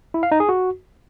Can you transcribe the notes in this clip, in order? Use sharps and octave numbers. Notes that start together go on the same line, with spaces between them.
E4
F5
D#4
G#4
F#4